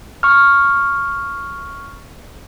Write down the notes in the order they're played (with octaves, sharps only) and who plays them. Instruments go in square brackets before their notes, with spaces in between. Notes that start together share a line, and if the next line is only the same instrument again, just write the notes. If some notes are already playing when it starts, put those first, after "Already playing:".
[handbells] C#6 F6